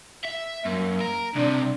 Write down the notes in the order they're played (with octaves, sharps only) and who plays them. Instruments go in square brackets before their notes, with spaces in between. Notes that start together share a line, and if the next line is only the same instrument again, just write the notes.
[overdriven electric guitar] E5
[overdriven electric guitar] F#2 [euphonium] A#3
[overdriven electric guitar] A#4
[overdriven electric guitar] C2 C3 [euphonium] D4